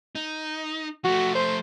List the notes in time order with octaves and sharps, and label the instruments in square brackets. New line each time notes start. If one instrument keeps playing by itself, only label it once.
[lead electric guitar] D#4
[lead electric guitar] F3 A3 [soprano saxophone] F#4
[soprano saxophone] C5